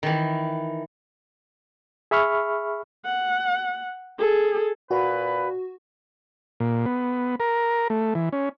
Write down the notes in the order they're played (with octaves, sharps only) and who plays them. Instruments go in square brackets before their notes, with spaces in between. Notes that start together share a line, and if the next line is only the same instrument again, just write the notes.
[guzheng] D#3 E3
[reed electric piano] G#4 E5 B5 C#6 F6
[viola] F#5
G#4 A4
[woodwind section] A#2 B4 [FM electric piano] F#4
[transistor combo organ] A#2
B3
A#4
A3
E3
C#4